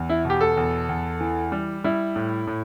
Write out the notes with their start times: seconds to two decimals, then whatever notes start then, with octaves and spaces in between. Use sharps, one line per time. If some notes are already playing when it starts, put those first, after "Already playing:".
Already playing: E2
0.09 E4
0.25 B2
0.30 G4
0.41 A4
0.57 E2
0.89 E2
1.21 E3
1.52 G3
1.84 G3 E4
2.16 A2
2.47 A2